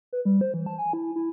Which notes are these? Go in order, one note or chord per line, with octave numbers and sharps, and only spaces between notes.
B4
G3
C5
E3
A5
G#5
E4
E4